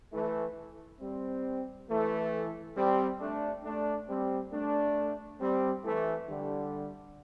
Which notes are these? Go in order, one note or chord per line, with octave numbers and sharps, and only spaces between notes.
E3 A3
G3 C4
E3 A3
G3 C4
A3 D4
A3 D4
G3 C4
A3 D4
G3 C4
E3 A3
D3 G3